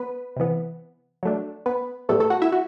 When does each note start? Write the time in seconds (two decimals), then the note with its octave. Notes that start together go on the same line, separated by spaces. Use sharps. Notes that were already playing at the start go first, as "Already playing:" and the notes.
Already playing: B3 B4
0.36 C3 E3 B3
1.23 F#3 A3 D4
1.66 B3 B4
2.09 A2 G3 A3 B3 A4
2.20 A3 A4
2.30 F#4 F#5
2.42 E4 E5
2.52 F#4